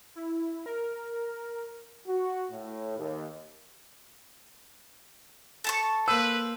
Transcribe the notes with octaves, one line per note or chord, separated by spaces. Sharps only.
E4
A#4
F#4
A2
D#2
A4 A5 C#6
A#3 B4 C5 E6